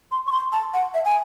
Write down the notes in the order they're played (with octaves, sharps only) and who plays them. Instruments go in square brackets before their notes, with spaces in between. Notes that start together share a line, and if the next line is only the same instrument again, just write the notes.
[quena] C6
C#6
C6
A5
F#5
E5
G#5